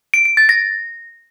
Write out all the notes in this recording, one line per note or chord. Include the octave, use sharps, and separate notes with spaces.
D7
D7
A6
A#6